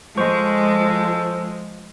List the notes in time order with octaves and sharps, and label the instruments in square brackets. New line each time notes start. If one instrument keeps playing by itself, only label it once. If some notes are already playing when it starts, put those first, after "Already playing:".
[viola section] F3 [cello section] G#3 [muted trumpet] A4 [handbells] C5 C#6